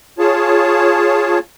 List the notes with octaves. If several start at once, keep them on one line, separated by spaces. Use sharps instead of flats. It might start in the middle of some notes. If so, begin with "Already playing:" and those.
F4 G#4 C#5 A5